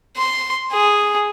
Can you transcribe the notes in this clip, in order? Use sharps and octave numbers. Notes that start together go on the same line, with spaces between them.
C6
G#4